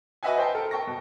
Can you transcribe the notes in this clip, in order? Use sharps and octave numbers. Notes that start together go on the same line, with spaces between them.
F#4 B4 D#5 E5 F#5 G#5
C5 G5 A5
A4 A#4
G5 A5 C#6 A#6
B2